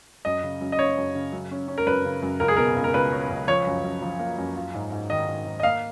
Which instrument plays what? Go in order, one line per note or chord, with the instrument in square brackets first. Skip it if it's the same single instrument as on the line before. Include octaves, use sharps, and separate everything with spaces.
[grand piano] F#2 [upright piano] D#5
[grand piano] C#3
F#2
[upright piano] D#5
[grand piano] C#3 [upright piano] C#5
[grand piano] F#2
C#3
F#2
C#4
C#4
[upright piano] A#4
[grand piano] F#2 [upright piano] B4
[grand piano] C#3
F#2
[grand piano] C#2 [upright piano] A#4
[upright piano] G#4
[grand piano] B2 [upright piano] A#4
[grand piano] C#2
[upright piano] A#4
[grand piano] C#2 [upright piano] B4
[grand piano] C#4
C#2
[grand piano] F3 [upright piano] C#5
[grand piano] F#2
F#2
F3
A#3
F#2
F4
G#2
G#2
[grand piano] D#3 [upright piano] D#5
[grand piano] G#2
G#2
[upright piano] D#5
[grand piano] A#3 [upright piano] F5